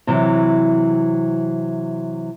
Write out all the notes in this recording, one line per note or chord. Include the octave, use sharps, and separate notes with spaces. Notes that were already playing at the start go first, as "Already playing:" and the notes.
C3 E3 F#3